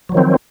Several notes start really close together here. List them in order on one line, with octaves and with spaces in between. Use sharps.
F#3 F3 D#3 C4